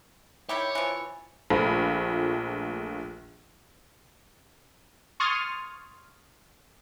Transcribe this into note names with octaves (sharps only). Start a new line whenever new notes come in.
D#3 E4 G4 C#5
E3 F3
A#1 F3 A3 F4 B5
C6 C#6 D#6 F6 G#6 A6